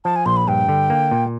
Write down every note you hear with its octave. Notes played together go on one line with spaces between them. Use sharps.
F3 A5
G#5
A#1 C6
B5
G2 G5
D3
A#3
A#2